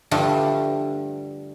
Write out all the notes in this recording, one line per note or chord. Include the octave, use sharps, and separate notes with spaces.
G2 D3 F3 G3 A3